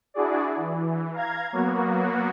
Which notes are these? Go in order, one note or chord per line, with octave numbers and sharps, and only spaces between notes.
D4 E4 F#4 G#4 D5
E3
F5 A#5 G#6
F#3 A#3 B3 F#4